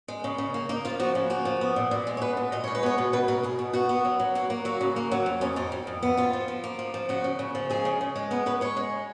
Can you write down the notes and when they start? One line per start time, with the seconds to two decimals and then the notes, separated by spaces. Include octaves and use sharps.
0.08 G#3
0.24 C#3
0.38 C#3
0.54 A#3
0.69 A#3 D#4
0.85 F3 F4
1.00 F3 F#4
1.15 C#3
1.30 A#3 F#4
1.45 F3
1.61 B3
1.76 A#2
1.91 A#2
2.07 G#3
2.17 C#5
2.21 B3 B4
2.37 A#2
2.52 A#2 D#5
2.64 G#3 C#5
2.75 B4
2.83 B3 C#5
2.98 B2
3.13 B2 B4
3.28 B2 A#4
3.43 B2 G#4
3.59 B2
3.73 B3 F#4
3.89 B3
4.05 F#3
4.19 F#3
4.35 A#3 F#4
4.50 A#3
4.65 F#3 F#4
4.81 C#3
4.96 A#3
5.12 F#3
5.26 F2
5.41 F2 C#4
5.56 F2 D#4
5.72 F2
5.87 F2
6.03 B3
6.17 F2 F4
6.33 F3
6.48 F3
6.64 A#3
6.79 F3
6.94 F3
7.09 C#3 F#4
7.24 C#3
7.39 C#3
7.55 F3
7.70 G#3 G#4
7.85 C#3
8.01 C#3
8.16 G#3
8.31 B3 A#4
8.46 C#3 B4
8.61 G#3 C#5
8.77 G#3